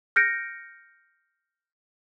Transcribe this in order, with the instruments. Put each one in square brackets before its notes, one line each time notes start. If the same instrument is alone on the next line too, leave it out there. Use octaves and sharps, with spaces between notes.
[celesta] F6 G6 A#6 C#7 D7